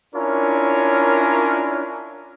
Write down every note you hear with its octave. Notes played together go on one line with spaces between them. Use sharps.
C#4 D4 E4 F4 A#4 C#5